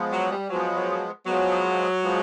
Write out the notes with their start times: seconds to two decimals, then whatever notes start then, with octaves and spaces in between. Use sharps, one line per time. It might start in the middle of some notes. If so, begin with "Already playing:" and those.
Already playing: F3 G#3 B3
0.12 F#3
0.31 G3
0.50 F3 F#3 G#3 B3
0.75 F#3
1.26 F3 F#3 G#3 B3
2.02 F3 G#3 B3